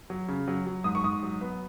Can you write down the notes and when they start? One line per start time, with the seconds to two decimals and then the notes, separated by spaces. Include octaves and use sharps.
0.10 F#3
0.28 C#3
0.48 F#3
0.67 F#3
0.84 G#2 D#6
0.95 C#6
1.04 G#2 D#6
1.23 F#3
1.41 B3